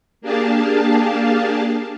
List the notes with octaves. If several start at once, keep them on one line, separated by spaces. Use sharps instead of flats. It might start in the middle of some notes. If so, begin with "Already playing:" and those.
A#3 D4 G4 G#4 F5 A5